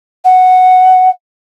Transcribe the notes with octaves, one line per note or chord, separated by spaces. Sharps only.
F#5